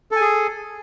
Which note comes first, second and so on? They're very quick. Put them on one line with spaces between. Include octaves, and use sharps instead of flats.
A4 G#5 G#4